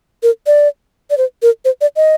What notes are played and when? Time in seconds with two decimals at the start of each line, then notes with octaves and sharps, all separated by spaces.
0.23 A#4
0.47 D5
1.10 D5
1.18 C5
1.42 A#4
1.65 C5
1.81 D5
1.96 D#5